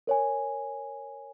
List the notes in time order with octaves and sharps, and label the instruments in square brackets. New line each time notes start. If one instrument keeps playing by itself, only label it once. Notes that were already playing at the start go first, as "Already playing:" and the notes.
[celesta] A#4 C#5 G#5